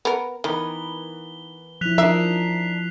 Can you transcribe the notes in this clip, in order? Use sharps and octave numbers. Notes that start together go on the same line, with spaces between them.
B3 A#4
D#3 E3 B3 A#4 G7
F3 E4 F#6 B6 F7
F3 D4 D#4 A#4 E5 C7